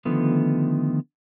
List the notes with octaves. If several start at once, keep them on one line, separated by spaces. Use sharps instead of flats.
D3 D#3 F3 A3 B3